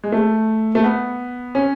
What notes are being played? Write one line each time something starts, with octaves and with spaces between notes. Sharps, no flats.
G#3
A3
A3
B3
C#4